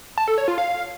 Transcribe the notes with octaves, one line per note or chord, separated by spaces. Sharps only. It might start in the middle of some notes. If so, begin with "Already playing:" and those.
A5
A4
C#5
F4
F5